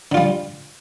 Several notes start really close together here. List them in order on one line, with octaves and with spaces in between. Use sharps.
D3 F4 G3